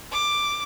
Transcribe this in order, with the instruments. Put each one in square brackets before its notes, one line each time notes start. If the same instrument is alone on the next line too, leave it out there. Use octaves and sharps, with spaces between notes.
[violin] D6